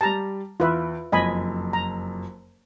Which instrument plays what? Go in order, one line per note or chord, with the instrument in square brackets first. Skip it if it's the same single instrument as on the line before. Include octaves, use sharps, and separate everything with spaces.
[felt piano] G3 G4 [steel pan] A5 A#5
[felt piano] E2 [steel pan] F4 B4 E5
[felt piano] F#1 F2 [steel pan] D#5 G#5 B5
[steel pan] A#5